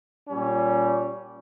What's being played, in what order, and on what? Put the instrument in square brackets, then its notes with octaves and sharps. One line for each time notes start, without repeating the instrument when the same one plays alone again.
[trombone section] A#2 G3 C#4